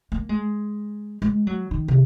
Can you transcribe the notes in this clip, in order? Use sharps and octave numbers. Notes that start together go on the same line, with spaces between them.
A#3
G#3
G#3
F#3
D#3
C3